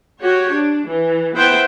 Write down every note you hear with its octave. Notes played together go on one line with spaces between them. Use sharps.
F#4 G4 C#5
D4
E3
B3 E4 C5 E5 F#5 G5